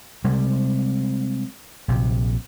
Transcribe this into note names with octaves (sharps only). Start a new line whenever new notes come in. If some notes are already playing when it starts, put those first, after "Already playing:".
C3 G3 G#3
A#1 C3